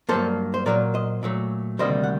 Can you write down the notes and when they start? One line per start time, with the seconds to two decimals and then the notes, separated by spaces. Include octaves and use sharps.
0.09 G2 F#3 A#3 A4 C5
0.54 C5
0.66 A#2 F#3 A#3 A#4 D5
0.94 C5 D#5
1.23 A#2 F#3 A3
1.79 D2 C3 D#3 G3 A#3 C5 D#5
2.04 F#5